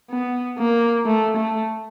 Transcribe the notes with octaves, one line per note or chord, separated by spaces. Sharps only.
B3
A#3
A3
A3